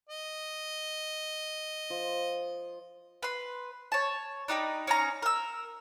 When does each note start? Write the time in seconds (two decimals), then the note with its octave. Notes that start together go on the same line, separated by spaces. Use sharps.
0.09 D#5
1.90 F3
3.23 B4 C6
3.92 C#5 A5
4.48 D4 D#4 G4 B5
4.87 C#4 D#4 A#5
5.22 A#4 E6